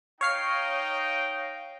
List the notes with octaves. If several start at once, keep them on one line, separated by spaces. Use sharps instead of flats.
D#4 C#5 F5 G5 C7